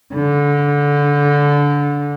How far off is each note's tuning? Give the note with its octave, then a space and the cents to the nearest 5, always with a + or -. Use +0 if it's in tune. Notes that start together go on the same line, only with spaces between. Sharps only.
D3 -20